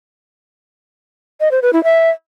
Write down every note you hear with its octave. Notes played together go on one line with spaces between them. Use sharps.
D#5
C5
B4
E4
E5